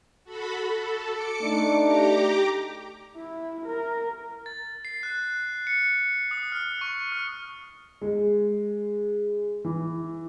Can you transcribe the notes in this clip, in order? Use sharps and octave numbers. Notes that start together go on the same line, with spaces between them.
F#4 A4 B5
A4
D6 C#7
A3 D4 D#4
G4 A#5 D6
E4
A#4
A6
C7
F#6
C#7
D#6
F6
C#6
F6
G#3
E3